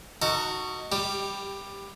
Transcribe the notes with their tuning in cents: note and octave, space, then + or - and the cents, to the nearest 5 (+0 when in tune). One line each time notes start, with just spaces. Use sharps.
D#4 +0 F#4 +0 A4 +35
G3 +15 G4 +0